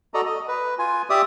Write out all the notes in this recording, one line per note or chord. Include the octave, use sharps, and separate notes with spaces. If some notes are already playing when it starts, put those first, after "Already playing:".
F#4 A4 D5 D#5 A#5
D#5
B4
F4 G#5
G4 D5 E5 D6 D#6